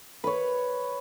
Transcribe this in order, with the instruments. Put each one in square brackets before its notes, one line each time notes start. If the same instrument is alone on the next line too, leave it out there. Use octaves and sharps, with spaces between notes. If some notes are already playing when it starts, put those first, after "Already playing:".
[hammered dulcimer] B4 C#5